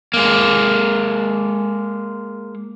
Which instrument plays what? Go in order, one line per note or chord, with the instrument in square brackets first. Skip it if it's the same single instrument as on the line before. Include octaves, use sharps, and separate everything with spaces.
[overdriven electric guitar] G#3 A#3